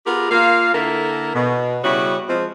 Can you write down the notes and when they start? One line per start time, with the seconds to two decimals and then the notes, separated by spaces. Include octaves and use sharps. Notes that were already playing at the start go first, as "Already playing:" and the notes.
0.06 B3 F4 G4 G#4 A#4
0.31 A#3 F4 F5
0.74 D3 A#3 E4 A4 A#4
1.35 B2
1.84 C#3 G3 B3 C#4 E4 F#4
2.28 F3 G#3 C4